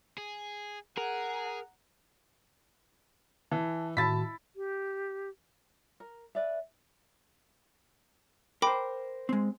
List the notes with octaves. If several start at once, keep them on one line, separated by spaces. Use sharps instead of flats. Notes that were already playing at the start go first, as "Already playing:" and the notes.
G#4
G#4 A#4 F#5 A#5
E3 A5
A2 D#3 E4 F#4 A5 A6 B6
G4
A#4
B4 D5 E5
A#4 C5 G5 B5 D6
G#3 C4